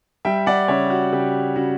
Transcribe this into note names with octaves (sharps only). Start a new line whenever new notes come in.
G3 E5 G5
D5 F#5
C#3 C#5 E5
F#4
C#3 G4
C#3 F#4